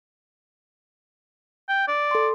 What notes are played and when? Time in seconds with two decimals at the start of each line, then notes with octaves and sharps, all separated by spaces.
1.69 G5
1.88 D5
2.11 A4 C6